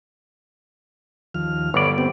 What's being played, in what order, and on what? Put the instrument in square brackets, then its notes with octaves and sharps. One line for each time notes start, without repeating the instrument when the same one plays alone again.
[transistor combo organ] D#2 F3 F6
[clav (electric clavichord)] G1 D5 [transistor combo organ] B4 C#5
[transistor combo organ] B3 C4 G4